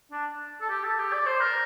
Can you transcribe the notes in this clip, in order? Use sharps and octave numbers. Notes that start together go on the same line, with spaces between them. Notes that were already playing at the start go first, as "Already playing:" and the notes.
D4
A4
G4
A4
G4
D5
C5
A#4